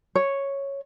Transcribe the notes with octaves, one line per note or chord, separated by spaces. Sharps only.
C#5